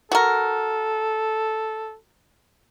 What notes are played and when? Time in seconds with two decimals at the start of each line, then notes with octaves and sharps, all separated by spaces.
0.12 F#4 A4 A#4